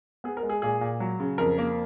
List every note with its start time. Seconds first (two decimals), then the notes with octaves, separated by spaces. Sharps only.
0.24 B3 G#4
0.37 A#4
0.43 G#3
0.49 G#4
0.62 A#2 G#4
0.81 A#2
1.00 F#3
1.20 C#3
1.38 F2 A#4
1.58 A#3